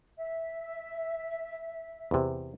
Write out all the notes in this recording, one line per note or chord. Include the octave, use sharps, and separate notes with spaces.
E5
E2 C3